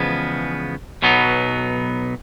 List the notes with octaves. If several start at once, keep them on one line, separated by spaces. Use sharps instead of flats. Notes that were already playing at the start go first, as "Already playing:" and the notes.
Already playing: E2 C#3 F3 G#3 B3
B1 B2 F#3 B3 D#4